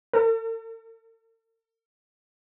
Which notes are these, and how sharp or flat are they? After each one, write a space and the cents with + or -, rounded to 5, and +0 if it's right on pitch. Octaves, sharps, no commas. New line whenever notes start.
A4 +45